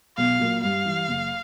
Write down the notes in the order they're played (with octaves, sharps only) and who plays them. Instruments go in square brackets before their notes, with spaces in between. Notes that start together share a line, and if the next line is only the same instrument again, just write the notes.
[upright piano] B1 [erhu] F5
[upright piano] A#2 F#3 A#3
[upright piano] G2 [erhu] F5
[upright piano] E3 G3
F#1